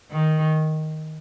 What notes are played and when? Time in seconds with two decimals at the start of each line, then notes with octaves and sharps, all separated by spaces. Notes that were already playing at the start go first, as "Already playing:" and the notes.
0.12 D#3